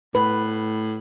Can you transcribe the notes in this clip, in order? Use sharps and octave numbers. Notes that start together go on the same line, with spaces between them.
A2 B4